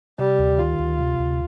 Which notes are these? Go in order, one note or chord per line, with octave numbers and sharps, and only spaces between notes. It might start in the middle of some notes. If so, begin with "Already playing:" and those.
C3 G3
D2
D#3 F4
D2
C3
D2